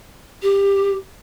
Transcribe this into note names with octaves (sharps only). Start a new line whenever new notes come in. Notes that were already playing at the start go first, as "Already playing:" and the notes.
G4